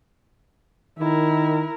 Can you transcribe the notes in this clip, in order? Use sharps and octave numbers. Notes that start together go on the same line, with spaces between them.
D#3 E4 A#4